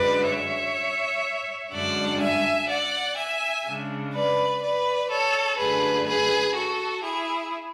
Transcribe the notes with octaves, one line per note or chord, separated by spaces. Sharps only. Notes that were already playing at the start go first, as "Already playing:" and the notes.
Already playing: F#2 D3 G#3 B4 D5
C#5 E5
F#2 D3 G#3 D4 D5 F#5
E5 G#5
D5 F#5
E5 G#5
C#3 G#3 D4
B4 D5
B4 D5
A4 C#5
F#2 D3 A3 G#4 B4
G#4 B4
F#4 A4
E4 G#4